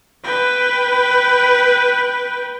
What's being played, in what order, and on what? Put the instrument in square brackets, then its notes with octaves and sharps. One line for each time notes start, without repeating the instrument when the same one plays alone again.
[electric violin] B4 G5